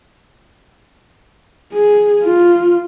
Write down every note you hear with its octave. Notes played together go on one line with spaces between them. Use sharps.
G#4
F4